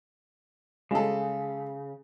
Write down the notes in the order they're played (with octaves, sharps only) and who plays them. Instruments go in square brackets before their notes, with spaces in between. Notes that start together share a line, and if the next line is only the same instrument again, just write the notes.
[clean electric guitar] C#3 [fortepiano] G#3 A4